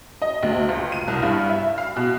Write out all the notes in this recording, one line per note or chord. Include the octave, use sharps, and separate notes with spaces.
D#5
D2
C#2
D#7
C2
G2
E5
F5
B2